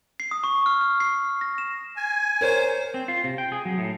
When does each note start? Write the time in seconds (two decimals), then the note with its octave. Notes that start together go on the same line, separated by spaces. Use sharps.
0.20 C7
0.31 D#6
0.44 C#6
0.66 F6
0.81 F6
1.00 C7
1.41 A#6
1.58 E7
1.96 G#5
2.41 A#4 C5 C#5
2.94 C4
3.08 F4
3.24 C3
3.38 G5
3.52 G#4
3.65 F#3
3.78 A2